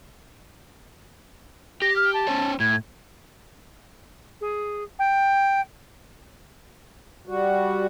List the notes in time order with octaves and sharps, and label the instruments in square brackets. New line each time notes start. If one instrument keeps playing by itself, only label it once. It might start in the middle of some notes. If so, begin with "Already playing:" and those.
[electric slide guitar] G4 [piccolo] A#6
[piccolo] F6
A5
[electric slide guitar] C#4 C5 C#5
[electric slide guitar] A2 [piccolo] G#6
[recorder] G#4
G5
[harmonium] G3 F#4